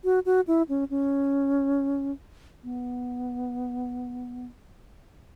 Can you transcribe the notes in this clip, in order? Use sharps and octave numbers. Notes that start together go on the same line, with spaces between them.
F#4
F#4
E4
C#4
C#4
B3